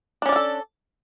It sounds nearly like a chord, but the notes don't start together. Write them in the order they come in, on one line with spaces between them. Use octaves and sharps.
D4 C#4 D5 A#4 A4